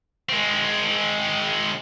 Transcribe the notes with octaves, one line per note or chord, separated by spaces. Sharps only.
G#3 C4